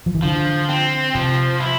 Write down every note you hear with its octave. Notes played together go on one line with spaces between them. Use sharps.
F3
E3
D3 F3
C4
C3 F3
E4